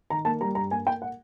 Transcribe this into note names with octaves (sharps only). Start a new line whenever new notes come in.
D#3 A#5
A#3 A5
G3 A#5
G2 A#5
A#3 G#5
A#3 G5
F#5